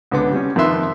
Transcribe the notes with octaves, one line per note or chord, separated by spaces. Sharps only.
C#2 D3 B3 D6
G3 C#4
F2 D#3 F3 B4 E5 C6